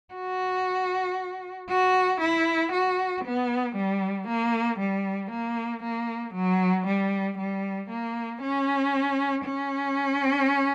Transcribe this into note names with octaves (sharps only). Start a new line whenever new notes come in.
F#4
F#4
E4
F#4
B3
G3
A#3
G3
A#3
A#3
F#3
G3
G3
A#3
C#4
C#4